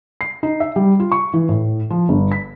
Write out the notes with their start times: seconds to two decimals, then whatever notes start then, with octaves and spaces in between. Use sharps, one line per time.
0.21 C7
0.43 D#4
0.60 E5
0.76 G3
1.00 F4
1.12 C#6
1.34 E3
1.49 A2
1.90 F3
2.09 G1
2.32 B6